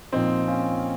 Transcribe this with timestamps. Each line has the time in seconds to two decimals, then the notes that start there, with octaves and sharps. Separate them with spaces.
0.12 A#2 F3 C4 D#4
0.48 C#4 F4